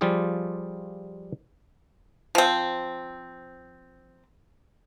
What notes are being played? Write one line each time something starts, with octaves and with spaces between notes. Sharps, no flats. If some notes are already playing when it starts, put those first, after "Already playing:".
F3 G3 F4 G4 G#4
F3 C4